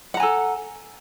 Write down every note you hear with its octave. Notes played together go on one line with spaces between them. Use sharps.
A4 F#5 G#5 A#5